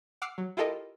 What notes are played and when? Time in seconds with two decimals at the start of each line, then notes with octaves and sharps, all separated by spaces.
0.22 F#5 D6 E6 F6 C7
0.38 F#3
0.57 E4 F4 G4 A4 A#4 D#5